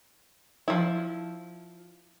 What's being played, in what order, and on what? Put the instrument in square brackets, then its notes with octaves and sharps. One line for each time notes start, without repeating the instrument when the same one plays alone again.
[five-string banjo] F3 E4